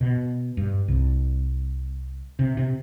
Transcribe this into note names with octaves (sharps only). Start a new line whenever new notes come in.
B2
G2
C2
C3
C3